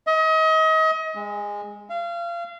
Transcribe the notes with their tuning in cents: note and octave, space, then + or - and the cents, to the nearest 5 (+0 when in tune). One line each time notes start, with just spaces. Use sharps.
D#5 +35
G#3 -20
F5 -30